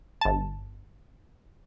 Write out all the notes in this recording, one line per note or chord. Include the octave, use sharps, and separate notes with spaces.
G1 A5